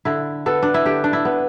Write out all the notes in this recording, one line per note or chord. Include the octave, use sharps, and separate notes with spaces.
D3 E4
B3 A4
D4
E4
D3 G4
D4
E4
B3